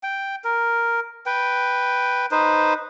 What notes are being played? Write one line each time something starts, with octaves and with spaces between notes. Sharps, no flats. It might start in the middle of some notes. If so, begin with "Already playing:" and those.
G5
A#4
B4 G5
D#4 B4 C5